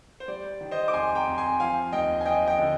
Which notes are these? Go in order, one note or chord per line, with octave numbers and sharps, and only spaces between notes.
C5
G3 D5
D#3
C5 D#5
D6
F2 G#5 C6
G5 A#5
F2
G#5 C6
F3 F5 G#5
D#2 D#5 G5
G#5
F3 D#5 G5
D#5 G5
D3